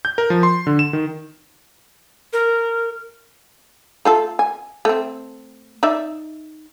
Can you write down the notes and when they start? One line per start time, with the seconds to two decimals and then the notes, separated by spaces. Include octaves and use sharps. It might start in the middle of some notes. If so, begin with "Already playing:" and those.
0.05 G6
0.18 A#4
0.30 F3
0.43 C6
0.67 D3
0.79 E7
0.93 D#3
2.33 A#4
4.05 A3 F4 A4
4.39 G#5
4.85 A3 C4
5.83 D#4 D5 E5